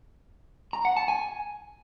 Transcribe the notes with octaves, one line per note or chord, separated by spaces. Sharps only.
A#5
F#5
A5
G#5